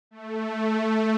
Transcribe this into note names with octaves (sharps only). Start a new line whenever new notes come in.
A3